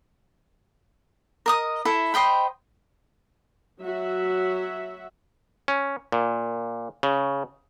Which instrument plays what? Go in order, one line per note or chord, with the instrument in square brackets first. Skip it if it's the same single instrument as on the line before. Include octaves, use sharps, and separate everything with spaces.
[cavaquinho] A#4 D#5 D#6
E4 A4 E5
C5 D#5 G5 B5
[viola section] F#3 F#4 E5
[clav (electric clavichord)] C#4
A#2
C#3